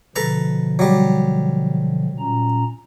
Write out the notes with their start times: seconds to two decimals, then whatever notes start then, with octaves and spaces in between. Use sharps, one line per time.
0.16 B2 D3 F3 A4 B4 A#5
0.79 F#3 G3
2.19 A#2 C#4 A#5